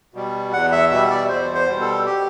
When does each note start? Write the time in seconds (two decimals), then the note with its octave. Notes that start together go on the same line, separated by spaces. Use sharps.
0.14 B2 G3
0.53 E2 F#5
0.72 E5
0.90 B2 G3 E5
1.10 D5
1.29 E2 C5
1.54 C5
1.68 B2 G3
1.81 A4
2.06 G4